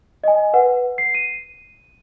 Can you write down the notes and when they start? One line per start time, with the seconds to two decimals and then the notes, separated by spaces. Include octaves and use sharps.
0.24 D#5 G#5
0.54 B4 F#5
0.98 C7
1.15 D#7